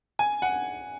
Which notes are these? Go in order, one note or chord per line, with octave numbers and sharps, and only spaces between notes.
G#5
F#5